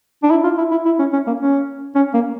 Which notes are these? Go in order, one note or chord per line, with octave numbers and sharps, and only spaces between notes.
D4
E4
F4
E4
E4
E4
C#4
C#4
A#3
C#4
C#4
A#3